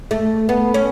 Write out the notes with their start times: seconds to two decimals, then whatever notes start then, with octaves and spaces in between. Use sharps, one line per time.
0.11 A3
0.49 B3
0.74 C#4